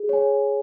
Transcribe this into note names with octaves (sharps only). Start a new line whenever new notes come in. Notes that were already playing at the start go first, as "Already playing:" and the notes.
Already playing: G#4
C#5 G#5